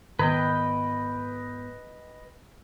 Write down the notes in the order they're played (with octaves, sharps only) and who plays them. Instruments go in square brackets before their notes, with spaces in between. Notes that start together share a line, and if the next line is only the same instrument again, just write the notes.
[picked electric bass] G#2 B3 [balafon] D#3 [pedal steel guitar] B4 D#5 G5